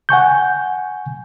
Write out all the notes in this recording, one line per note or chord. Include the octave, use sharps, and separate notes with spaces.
F#5 G#5 C#6 G6